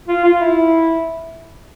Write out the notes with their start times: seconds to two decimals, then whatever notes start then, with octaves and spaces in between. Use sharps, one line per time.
0.08 F4
0.24 F4
0.41 E4